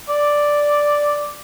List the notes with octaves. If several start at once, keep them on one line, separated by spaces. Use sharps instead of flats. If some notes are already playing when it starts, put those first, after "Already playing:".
D5